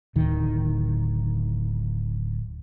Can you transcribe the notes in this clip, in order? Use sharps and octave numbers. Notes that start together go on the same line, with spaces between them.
D1 D#3